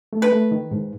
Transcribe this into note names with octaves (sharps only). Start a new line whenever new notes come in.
A3
B4
A3
D#3
G#2